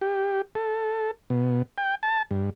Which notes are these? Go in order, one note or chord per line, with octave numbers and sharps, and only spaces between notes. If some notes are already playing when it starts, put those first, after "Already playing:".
G4
A4
B2
G5
A5
G2